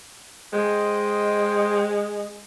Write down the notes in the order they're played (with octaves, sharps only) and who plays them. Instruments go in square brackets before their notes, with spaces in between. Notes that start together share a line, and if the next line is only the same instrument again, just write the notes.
[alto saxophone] G#3 [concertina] C5 D#5 G5